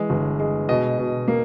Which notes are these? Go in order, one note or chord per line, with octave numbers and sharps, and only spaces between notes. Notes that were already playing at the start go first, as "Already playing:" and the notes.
Already playing: E3 G#3
G1
G#3
B2 D#5
B2
A#3